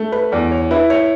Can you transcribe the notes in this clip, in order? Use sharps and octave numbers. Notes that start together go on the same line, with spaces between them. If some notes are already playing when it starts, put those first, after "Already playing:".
Already playing: A3
B4
E2 D5
C#5
E4 B4
C#5